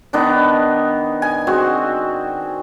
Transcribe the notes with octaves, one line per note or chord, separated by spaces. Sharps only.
D#3 B3 D4
G#5
C4 F#4 G#4